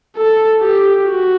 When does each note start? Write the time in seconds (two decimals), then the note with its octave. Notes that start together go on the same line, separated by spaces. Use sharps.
0.17 A4
0.61 G4
1.05 F#4